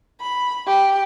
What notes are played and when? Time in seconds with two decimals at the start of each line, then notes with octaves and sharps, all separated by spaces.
0.21 B5
0.67 G4